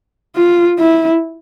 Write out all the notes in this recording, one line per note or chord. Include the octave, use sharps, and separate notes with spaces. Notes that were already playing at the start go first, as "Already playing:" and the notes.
F4
E4